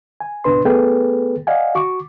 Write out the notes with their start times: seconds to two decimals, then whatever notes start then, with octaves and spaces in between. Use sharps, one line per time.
0.21 G#5
0.44 C#2 G#2 B2 D4 B4 C6
0.65 A3 B3 G#4 A4 B4 G5
1.47 D5 D#5 F5 F#5 G#5
1.75 F#4 C#6 D6